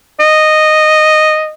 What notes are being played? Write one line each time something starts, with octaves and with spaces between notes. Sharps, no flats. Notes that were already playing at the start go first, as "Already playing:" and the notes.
D#5